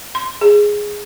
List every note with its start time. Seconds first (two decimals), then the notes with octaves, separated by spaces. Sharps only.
0.15 C6
0.41 G#4